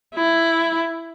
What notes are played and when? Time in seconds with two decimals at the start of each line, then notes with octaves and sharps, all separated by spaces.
0.15 E4